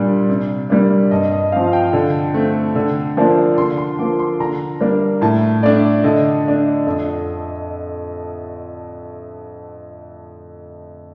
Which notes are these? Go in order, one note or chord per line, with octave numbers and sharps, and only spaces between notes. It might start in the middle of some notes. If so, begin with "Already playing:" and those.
Already playing: A#2 G3 D4
C3
G3 A#3 D4
G2 D#5
D#5
F3 C4 F5
G5
D3
A3 C4
D3
F3 A#3 D4
D3 C6
C6
F3 A#3 D6
C6
D3 A#5
G3 A#3 D4
A2 A5
A3 D4 D5
D3 D#5
A3 D4
F2